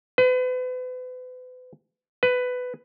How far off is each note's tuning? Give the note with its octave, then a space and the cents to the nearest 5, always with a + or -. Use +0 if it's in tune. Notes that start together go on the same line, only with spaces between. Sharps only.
B4 +40
B4 +15